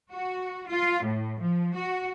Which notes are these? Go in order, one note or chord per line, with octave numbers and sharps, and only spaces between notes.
F#4
F4
A2
F3
F#4